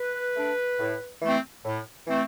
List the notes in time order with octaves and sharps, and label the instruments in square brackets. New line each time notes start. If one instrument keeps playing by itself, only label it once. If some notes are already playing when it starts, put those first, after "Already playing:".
Already playing: [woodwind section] B4
A3 D4
A2
E3 A3 C4
A2
E3 A3 C4